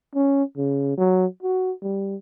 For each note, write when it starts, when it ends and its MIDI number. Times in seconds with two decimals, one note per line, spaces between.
0.15 0.43 61
0.57 0.93 49
0.98 1.26 54
1.43 1.72 66
1.82 2.16 55